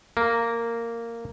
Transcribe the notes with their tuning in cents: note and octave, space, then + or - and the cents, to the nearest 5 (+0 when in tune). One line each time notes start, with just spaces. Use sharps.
A#3 -10